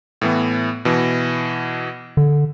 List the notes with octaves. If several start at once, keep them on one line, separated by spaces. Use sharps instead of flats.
A2 E3 B3
B2 E3
D3